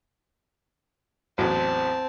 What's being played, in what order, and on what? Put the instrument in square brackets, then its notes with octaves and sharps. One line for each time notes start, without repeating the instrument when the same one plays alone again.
[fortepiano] A1 E2 F#3 [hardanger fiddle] C4 A5